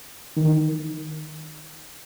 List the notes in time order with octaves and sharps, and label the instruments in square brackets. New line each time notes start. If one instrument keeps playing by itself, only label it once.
[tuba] D#3